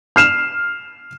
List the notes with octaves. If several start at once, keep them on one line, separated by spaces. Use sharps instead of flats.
F6 C7 E7 F7